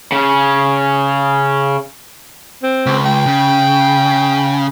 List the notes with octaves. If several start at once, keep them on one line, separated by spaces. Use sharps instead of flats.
C#3 C#4
C4
C#2
G5
C#3